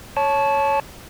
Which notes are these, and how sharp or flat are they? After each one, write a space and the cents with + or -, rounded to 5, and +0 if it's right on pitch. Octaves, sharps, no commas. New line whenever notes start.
C#5 +0 A5 -20